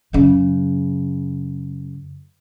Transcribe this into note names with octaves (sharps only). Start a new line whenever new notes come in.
F#2 C#3